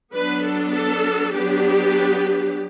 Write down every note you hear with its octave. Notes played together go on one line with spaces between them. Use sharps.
F#3 B3 D4 B4
A4
A4
F#3 B3 D4 G4